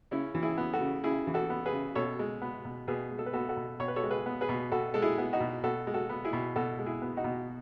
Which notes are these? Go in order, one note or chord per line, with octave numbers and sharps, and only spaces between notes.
C#3 C#4 E4
E3
E4 G#4
B3
F#4 A4
C#3
C#3 E4 G#4
E3
F#4 A4
B3
G#4 B4
C#3
B2 A4 C#5
G#3
B3
B2
B2 G#4 B4
G#3
A4
B4
B3 F#4 A4
F#4 A4
B2
B2 C#5
B4
A4 C#5
G#3
G#4 B4
B3
G#4 B4
B2
B2 F#4 A4
G#3 A4
E4 G#4
B3
D#4 F#4
B2
B2 F#4 A4
G#3
F#4 A4
B3
E4 G#4
B2
B2 F#4 A4
G#3
E4 G#4
B3
D#4 F#4
B2